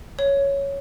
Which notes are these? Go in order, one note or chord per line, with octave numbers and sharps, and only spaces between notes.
C#5